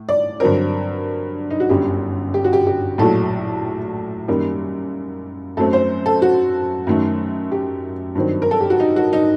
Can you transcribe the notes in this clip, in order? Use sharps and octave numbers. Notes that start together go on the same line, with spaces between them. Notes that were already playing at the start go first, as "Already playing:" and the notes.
Already playing: A2
D5
G2 D3 F#3 C4 A#4
D#4
F#4
G1 F#2 D3 G3 G4
G4
F#4
G4
G4
A#1 A2 F#3 A4
F#2 D#3 G3 A#3
F#2 F#3 A3 C4 A4
C5
A4
F#4
F#2 D#3 F#3 A3
G4
G2 D#3 F#3 C4
A#4
A4
G4
F#4
D#4
F#4
D#4